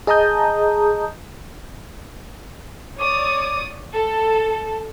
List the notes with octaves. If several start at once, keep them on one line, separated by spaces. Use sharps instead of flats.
G#4 D#5 A5 A#5 D#6 G6
C#5 D5 D6 D#6
A4 A5